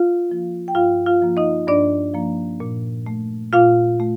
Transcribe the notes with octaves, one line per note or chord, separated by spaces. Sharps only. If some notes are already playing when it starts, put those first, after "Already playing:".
Already playing: F4 F5
F3 A#3
G5
G2 F4 F5
F4 F5
F3 A#3
D#4 D#5
G2 D4 D5
F3 A#3
A#2
A3
A#2 F4 F5
A3